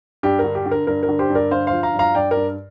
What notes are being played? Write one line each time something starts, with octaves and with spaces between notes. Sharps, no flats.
G2 G4
A#4
D3
G4
D3
A#4
G2 A#4
A#4
D3
G4 C5
G2
A#4 D5
D3 C5 F5
C5 F5
F3
F5 A#5
G2
F5 A#5
G2 D5 G5
A#4 D5
G2